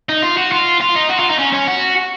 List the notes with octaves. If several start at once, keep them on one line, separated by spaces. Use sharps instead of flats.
D#4
F4
F#4
F4
F4
D#4
F#4
F4
D#4
C#4
C#4
F#4